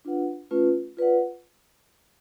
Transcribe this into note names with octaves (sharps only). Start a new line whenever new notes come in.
D4 F4 B4 F#5
A3 C#4 F4 B4
F4 B4 D5 F#5